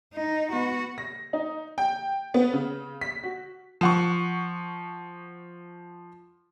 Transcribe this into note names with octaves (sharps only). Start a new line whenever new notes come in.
D#4
B3 F#4
A#6
D#4
G5
B3
C#3
B6
F#4
F3 F#5 C#6